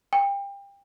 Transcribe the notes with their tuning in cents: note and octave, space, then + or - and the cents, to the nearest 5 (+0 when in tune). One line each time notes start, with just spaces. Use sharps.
G5 +30